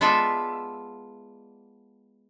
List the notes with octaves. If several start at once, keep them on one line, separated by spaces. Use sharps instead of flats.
G#3 B3 F4 A4 D5 E5